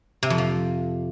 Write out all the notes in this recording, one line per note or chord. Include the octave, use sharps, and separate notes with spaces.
C3
F2
F3